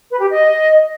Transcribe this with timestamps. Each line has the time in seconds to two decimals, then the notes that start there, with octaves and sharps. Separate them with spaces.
0.10 B4
0.20 G4
0.30 D#5